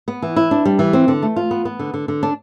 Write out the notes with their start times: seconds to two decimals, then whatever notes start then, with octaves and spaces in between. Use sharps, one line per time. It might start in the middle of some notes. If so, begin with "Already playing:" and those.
0.08 B3
0.22 E3
0.36 E4
0.51 D4
0.65 G3
0.79 E3
0.93 C4
1.08 D3
1.23 A3
1.36 F4
1.51 B3
1.65 B3
1.79 D3
1.94 D3
2.08 D3
2.23 D4